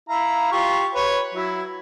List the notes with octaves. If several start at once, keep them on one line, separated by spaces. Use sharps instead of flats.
E4 F5 A#5
F4 G4 C#6
B4 C#5
F#3 E4